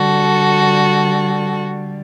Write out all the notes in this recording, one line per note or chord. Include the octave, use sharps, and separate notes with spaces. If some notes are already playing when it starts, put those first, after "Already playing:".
Already playing: D3 G3 F#4 A4